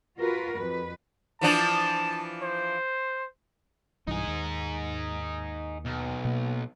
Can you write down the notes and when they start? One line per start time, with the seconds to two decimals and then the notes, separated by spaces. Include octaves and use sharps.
0.18 F4 F#4 A#4 B4
0.53 F2 B4
1.41 E3 F3 D4 A5
2.42 C5
4.08 B1 G2 E3 D#4 G#4
4.27 D#2
5.86 B1
6.25 B2 A#3